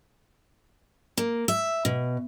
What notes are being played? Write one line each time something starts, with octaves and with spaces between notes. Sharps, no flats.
A#3
E5
B2